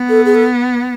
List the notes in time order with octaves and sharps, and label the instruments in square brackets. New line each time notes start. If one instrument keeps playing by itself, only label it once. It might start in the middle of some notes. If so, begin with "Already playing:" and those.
Already playing: [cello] B3
[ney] A4
G#4
A4